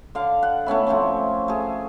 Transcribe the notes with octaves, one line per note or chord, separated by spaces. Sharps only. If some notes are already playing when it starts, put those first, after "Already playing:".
D3 F5
F#5
A3 B3 C#4 E4
F3 A3 C4 C#4
A3 G#4